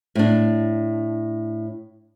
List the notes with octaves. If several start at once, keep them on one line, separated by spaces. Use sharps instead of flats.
A2 D4